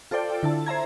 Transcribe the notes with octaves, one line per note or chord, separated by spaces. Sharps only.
F4 A4 C5 D5 G5
D3 E4 A5
C5 E5 A#5 G#6